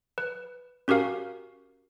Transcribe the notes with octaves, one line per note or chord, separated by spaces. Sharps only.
B4
C#4 F#4 G4 A#4 F5